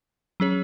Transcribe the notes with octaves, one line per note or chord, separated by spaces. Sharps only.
F#3 C#4 G#4 C#5